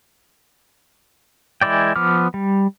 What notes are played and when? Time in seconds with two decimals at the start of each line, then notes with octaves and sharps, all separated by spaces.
1.61 E3 G#3 E4 D5 G5
1.96 F3 B3 D6 F6
2.34 G3